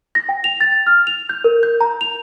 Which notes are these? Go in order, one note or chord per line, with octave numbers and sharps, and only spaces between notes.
A#6
G5
F7
A6
F6
F7
G6
A#4
G6
A#5
F7